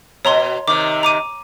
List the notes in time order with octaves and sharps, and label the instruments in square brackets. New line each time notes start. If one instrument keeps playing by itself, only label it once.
[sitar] B2 [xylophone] C#5 A#5 C6
[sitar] C3 D#3 [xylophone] D6
[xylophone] A#5 D6 D#7